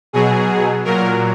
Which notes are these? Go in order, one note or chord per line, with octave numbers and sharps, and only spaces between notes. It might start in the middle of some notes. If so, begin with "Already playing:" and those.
B2 F#3 G#4
A#2 F#3 A#4